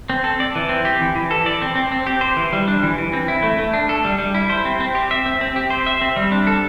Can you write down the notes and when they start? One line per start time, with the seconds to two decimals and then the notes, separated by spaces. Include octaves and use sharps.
0.10 C4
0.24 A4
0.40 D5
0.55 E3
0.69 C4
0.85 G4
1.01 E3
1.15 E3
1.31 A4
1.46 D5
1.62 C4
1.76 C4
1.92 C4
2.07 G4
2.21 C5
2.36 E3
2.53 G3
2.68 D4
2.83 E3
2.98 E3
3.13 C4
3.28 E4
3.43 A3
3.58 A3
3.73 D4
3.89 A4
4.05 G3
4.19 G3
4.34 E4
4.50 C5
4.65 C4
4.80 C4
4.95 G4
5.11 E5
5.26 C4
5.41 C4
5.56 G4
5.70 C5
5.86 E5
6.01 C4
6.16 G3
6.32 D4
6.47 A4